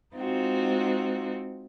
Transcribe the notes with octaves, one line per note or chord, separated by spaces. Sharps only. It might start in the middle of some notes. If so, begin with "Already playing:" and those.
G#3 C4 D#4 F4 F#4